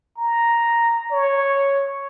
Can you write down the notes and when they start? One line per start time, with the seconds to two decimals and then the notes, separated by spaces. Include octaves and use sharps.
0.18 A#5
1.12 C#5